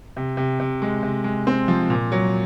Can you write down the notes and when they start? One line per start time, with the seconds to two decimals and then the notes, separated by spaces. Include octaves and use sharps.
0.17 C3
0.37 C3
0.60 C3
0.82 G#3
1.03 C3
1.24 G#3
1.47 C4
1.68 F3
1.90 A#2
2.12 F#3